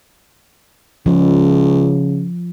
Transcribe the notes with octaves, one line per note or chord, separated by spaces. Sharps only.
C#2 C#3 F3